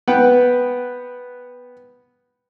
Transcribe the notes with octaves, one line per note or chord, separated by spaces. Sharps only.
B3 B4 F#5 G5